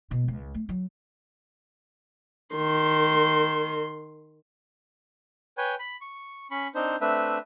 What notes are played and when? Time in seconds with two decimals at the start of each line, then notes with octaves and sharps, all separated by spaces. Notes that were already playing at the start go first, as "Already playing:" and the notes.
0.11 B2
0.28 C#2
0.54 A3
0.69 F#3
2.56 D#3 C6
5.57 B4 C#5 G5 G#5
5.79 B5
6.01 C#6
6.51 C#4 B5 C#6
6.75 C4 D4 D#4 C5
7.01 A3 C4 D4 B4 E5